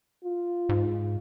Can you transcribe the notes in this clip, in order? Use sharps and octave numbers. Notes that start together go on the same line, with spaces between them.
F4
G#2